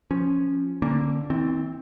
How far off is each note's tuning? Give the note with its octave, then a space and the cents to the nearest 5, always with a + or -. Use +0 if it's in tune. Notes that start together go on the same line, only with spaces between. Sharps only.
F3 +0 C#4 +0
D3 +0 A#3 +0 C#4 -35
E3 -40 C4 +0